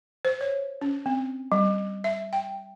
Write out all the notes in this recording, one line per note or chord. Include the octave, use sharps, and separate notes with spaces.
C5
C#5
C#4
C4
G3
E5
G5